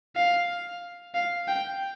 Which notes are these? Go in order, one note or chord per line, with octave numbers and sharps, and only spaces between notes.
F5
F5
G5